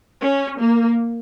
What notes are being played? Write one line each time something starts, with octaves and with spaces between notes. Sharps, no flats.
C#4
A#3